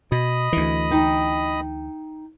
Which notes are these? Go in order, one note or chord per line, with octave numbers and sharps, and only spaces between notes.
B2 D#5 B5 D#6
D2 E3
D#4 G5